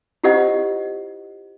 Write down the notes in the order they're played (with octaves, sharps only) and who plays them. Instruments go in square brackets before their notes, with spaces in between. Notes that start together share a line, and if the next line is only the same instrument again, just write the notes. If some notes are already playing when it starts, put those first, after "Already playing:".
[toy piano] E4 F4 G4 C5 D#5 F#5